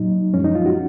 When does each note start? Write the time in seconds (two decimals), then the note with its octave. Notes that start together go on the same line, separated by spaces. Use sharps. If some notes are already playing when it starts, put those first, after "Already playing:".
Already playing: A#2 F#3 D#4
0.34 F#2 F3 G#3 C#4
0.44 D#4
0.55 F4
0.66 F#4